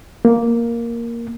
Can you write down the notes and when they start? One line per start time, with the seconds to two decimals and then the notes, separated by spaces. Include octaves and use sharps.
0.25 A#3